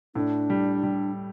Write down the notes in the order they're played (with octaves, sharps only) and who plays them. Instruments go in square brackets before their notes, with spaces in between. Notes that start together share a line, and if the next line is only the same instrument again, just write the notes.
[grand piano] A2 [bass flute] D4
[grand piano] G3
G3